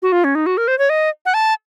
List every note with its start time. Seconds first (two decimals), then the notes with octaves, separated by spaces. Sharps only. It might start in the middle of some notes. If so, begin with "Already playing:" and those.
0.02 F#4
0.12 F4
0.24 C#4
0.35 D#4
0.46 F#4
0.57 A#4
0.68 C5
0.79 C#5
0.90 D#5
1.26 F#5
1.34 A5